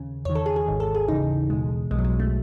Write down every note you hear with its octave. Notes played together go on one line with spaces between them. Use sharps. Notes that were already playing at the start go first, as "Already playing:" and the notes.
Already playing: D#2 C#3
E2 D#3 C#5
A4
G#4
G#4
G#1 G#2 D#3
A4
G#4
D#2 C#3 E3 D#4
E2 B2 G#3
B1 B2 G#3
F#3
G#3
A3